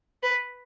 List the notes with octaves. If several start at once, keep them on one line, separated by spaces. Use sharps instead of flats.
B4